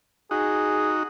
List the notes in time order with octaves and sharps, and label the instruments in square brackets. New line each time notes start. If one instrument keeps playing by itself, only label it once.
[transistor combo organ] D#4 F#4 [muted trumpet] G#4